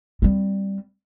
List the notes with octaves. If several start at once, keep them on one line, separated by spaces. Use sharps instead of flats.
G3 C4